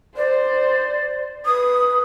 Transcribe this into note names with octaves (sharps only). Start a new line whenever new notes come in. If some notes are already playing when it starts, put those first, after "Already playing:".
C5 D5
B4 D#6